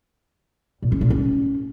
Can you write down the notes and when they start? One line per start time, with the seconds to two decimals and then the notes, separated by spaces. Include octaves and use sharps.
0.82 A#2
0.92 C#4
1.01 A#2
1.10 C#4